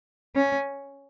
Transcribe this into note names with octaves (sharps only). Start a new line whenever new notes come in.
C#4